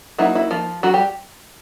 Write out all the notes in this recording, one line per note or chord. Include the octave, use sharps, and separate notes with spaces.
F#3 A#3 D#4 E4
E4
F3 F4
F#3 F#4
G3 G4